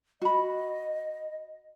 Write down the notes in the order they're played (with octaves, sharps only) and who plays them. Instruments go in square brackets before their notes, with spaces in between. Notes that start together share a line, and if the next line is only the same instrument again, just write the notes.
[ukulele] F#4 B5 [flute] D#5